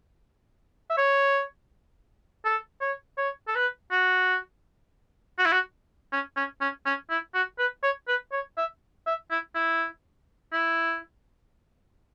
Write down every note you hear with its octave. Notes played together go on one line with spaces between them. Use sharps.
E5
C#5
A4
C#5
C#5
A4
B4
F#4
F#4
E4
F#4
C#4
C#4
C#4
C#4
E4
F#4
B4
C#5
B4
C#5
E5
E5
E4
E4
E4